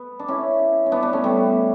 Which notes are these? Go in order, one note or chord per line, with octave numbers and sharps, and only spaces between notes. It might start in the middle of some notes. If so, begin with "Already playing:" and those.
Already playing: B3
D4
C#4 E4
C#4
B3 D4
B3 D4
A3 C#4
G3 B3